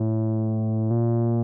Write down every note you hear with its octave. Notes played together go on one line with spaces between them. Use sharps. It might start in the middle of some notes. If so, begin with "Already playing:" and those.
Already playing: A2
A#2